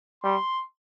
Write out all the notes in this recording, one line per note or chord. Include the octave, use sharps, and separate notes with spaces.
G3 C6